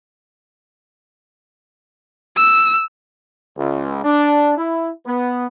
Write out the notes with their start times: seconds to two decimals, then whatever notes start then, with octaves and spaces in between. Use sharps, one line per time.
2.36 E6
3.57 C#2
4.04 D4
4.57 E4
5.06 B3